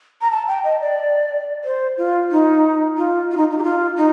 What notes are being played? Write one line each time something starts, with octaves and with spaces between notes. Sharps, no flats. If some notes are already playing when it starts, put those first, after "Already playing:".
A#5
A5
G5
D#5
D5
C5
F4
D#4
F4
F4
D#4
D#4
G4
F4
D#4